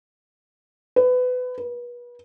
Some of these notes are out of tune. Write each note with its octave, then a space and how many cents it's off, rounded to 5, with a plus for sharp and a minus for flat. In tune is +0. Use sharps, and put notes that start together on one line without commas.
B4 +25
B4 -35